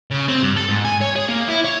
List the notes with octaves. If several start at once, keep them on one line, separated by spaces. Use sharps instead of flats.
C#3
C4
G2
A4
G#2
G#5
C#5
G#4
A#3
E4
C#5